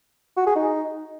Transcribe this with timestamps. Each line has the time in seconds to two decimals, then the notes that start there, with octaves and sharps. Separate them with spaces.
0.37 F#4
0.46 G#4
0.56 D#4